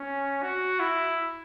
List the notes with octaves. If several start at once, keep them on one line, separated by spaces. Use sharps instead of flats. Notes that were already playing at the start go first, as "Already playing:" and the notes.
Already playing: C#4
F#4
E4